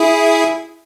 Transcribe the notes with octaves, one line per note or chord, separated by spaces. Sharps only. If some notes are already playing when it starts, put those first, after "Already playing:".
Already playing: E4 G#4